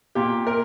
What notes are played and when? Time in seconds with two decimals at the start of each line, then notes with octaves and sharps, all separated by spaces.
0.15 A#2 G4
0.47 A#4